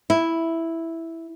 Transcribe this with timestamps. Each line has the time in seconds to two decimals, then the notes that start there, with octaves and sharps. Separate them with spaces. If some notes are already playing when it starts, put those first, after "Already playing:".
0.10 E4